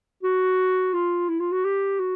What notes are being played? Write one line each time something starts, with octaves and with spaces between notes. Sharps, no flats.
F#4
F4
E4
F4
F#4
G4
F#4